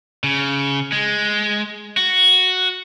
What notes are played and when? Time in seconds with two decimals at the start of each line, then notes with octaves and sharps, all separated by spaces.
0.24 C#3
0.92 G#3
1.97 F#4